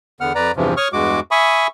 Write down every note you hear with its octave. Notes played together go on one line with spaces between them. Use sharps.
E2 D3 B3 F#5 F6
F2 B4 D5 A#5
E2 G2 C3 E3 F3
C#5 C#6 D#6 F6
E2 G2 G#3 F#4 D6
E5 G#5 B5 C#6 D#6